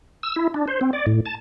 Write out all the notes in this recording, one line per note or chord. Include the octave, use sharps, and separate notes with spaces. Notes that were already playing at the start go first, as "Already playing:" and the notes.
E6
E4
D4
C5
C4
D5
A2
A5